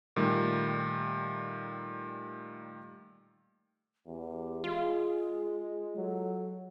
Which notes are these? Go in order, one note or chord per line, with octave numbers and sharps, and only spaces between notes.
A#2 D#3 G3 A3
E2 G4
G#3 F4 G#4
F#3 A4